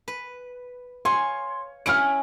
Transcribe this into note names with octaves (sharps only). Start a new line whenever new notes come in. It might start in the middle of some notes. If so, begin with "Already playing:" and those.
B4
C#5 F5 G#5 C6
C#4 E4 F#5 F6 D7